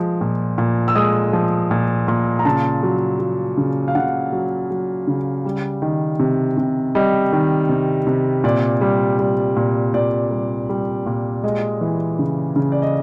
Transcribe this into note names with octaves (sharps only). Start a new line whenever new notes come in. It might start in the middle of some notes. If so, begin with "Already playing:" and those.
Already playing: F3 G#3
A#2
A#2
E6
G#3 D#6
F3
A#2
A#2
A#5
C#3 A5
F#3
F#3
C#3
F5
C#3 F#5
F#3
F#3
C#3
G3
D#3
C3
C3
G3 D#5
D#3
C3
C3
A#2 D5
G3
G3
A#2
A#2 D5
G3
G3
A#2
G#3 D#5
E3
C#3
C#3
D5
D#5